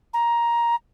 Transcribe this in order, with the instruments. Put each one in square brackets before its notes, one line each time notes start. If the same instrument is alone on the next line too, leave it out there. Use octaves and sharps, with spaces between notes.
[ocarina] A#5